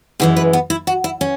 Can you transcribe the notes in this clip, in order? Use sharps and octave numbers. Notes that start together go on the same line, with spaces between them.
F#2 E3 G#3 G#4
B4
B3
E4
F#4
E4
C#4